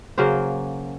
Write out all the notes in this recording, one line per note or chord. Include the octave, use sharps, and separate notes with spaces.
C#3 F#3 A#3 C5